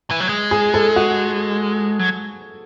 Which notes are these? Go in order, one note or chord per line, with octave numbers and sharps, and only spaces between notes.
E3
F#3
G#3
G#4
A4
F#4
F#3